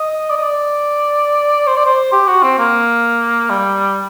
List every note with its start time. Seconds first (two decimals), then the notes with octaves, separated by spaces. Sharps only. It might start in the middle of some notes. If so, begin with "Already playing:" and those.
Already playing: D#5
0.30 D5
0.37 D#5
0.43 D5
1.67 C5
1.77 D5
1.86 C5
2.12 G4
2.27 F#4
2.43 C4
2.59 A#3
3.50 G3